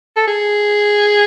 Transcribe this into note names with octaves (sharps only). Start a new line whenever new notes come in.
A4
G#4